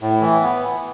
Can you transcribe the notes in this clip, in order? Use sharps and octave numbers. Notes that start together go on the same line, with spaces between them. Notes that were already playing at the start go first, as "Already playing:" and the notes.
A2
E3
B3